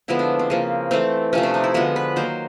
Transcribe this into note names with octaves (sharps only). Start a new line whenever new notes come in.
D3 F3 G#3 B3 E4
D4
C4
C#3 F3 A#3
E3 A3 C4
C3 F3 A3 C#4
D4
D#4
E4
D3 F3 G#3 B3 F#4
B4
D#3 F#3 A#3 C5